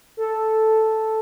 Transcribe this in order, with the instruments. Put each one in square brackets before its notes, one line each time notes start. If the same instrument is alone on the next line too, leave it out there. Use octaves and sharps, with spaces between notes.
[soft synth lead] A4